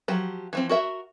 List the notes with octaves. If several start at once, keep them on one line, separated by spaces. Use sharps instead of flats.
F3 F#3 G4
E3 F3 C4
F#4 A#4 E5